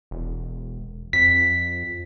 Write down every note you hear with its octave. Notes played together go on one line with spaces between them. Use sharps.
E1
F2 B6